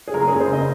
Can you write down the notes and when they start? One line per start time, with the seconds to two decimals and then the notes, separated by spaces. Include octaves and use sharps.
0.08 G#4
0.14 F#1 A#4
0.28 C#3 G#4
0.40 C5
0.49 C#3 D#5